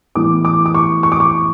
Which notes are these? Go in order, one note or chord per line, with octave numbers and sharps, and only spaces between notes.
A2 E3 B3 D6
D6
D6
C#6
C#6
D6
C#6